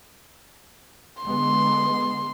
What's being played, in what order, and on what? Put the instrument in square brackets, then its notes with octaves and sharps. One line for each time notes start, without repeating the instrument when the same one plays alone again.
[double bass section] D3 G#3 B3 [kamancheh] C6